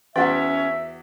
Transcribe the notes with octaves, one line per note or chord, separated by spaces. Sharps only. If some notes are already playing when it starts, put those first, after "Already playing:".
E2 E3 C#4 F#4 E5 G5